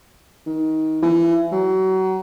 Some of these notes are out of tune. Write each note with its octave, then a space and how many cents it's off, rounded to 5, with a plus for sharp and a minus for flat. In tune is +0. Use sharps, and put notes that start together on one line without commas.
D#3 +20
E3 +30
F#3 +30